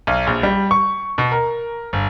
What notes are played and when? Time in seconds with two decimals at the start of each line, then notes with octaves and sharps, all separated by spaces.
0.07 B1
0.27 A#1
0.43 G3
0.71 C#6
1.18 B2
1.32 A#4
1.93 G1